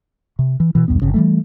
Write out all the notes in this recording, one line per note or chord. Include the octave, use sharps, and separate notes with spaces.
C3
E3
B2 E3
B1 E2 G2 B3
G1 C#3
E3 G3 A3